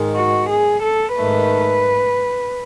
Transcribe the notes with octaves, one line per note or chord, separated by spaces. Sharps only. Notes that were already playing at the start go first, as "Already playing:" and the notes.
Already playing: G#2 D#3 G#3
F#4
G#4
A4
G#2 D#3 A3 B4